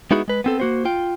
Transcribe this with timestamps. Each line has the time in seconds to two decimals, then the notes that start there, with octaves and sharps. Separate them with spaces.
0.11 G#3 B3 D#4 E4 F#4 G#4
0.28 G#3 B4
0.44 B3 C4 A4
0.60 A#3 F#4 C5
0.85 F4 G5